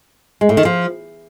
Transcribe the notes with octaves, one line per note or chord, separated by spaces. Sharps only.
G#3
A2
D#3
F3